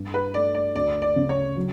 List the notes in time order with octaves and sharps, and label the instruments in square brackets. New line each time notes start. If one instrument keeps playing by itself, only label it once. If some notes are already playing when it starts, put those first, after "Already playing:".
Already playing: [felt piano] G2
[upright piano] B4
[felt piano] A3 [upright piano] D5
[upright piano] D5
[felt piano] D2 [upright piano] D5
[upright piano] D5
[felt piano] C#3
[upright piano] C#5
[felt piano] F#3